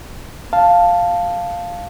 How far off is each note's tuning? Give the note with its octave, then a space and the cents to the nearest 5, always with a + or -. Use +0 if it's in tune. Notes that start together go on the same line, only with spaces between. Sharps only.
F5 +0 A5 +0